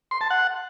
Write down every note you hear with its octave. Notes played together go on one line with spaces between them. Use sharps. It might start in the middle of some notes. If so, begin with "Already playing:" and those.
C6
A5
F#5